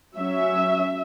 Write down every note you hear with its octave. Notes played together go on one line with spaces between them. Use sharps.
F#3 C#4 E5